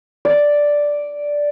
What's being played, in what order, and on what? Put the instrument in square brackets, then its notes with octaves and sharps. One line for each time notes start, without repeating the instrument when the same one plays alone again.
[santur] D5